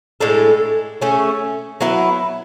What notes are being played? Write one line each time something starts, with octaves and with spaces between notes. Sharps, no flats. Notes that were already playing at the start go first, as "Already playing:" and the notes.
A2 G#3 D4 A4
A3 C#4 G#4
F#3 B3 E4 B4